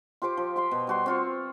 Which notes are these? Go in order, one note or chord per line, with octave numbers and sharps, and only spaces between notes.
F4 G4 C5 D6
F3
G4 G5 C6
B2
G3 F#4 C6
C4 F4 C#6